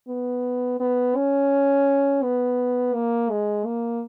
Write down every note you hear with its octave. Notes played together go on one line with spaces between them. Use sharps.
B3
B3
C#4
B3
A#3
G#3
A#3